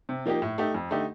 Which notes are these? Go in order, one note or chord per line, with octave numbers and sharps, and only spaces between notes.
C3
F3 A#3 D#4 G4
A2
A3 D#4 G4
F2
D3 A3 D#4 G4